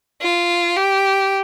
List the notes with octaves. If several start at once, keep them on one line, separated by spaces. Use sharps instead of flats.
F4
G4